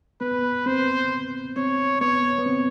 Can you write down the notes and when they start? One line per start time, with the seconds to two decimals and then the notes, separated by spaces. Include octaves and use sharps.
0.21 B3 B4
0.66 C4 C5
1.56 C4 C#5
2.01 B3 C#5
2.39 B3
2.46 C4